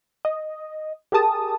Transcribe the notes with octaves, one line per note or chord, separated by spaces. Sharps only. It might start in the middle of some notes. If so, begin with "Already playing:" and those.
D#5
G4 G#4 A#4 A5 D#6